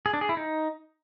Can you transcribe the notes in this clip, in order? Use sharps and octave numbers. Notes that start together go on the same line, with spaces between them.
G#4
D4
G#4
E4
D#4